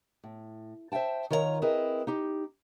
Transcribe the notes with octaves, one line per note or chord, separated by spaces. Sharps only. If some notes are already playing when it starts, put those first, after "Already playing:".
A2
C5 E5 F5 G5 A5
D#3 F4 A#4 C#5 D#5 A#5
C4 E4 G#4 A#4 B4 D#5
D#4 G4